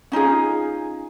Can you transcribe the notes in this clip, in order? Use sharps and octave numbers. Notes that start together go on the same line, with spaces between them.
C#4 D#4 F4 G#4